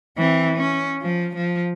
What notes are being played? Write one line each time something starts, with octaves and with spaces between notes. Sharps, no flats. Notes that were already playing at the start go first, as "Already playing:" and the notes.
E3 C4
C#4
F3
F3